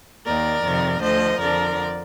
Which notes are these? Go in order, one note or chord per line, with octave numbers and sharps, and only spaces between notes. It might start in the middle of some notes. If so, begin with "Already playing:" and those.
D#2 D#3 A#4 D5
F2 C3 D#3
D2 D3 F3 C5 D#5
F2 D3 F3 A#4 D5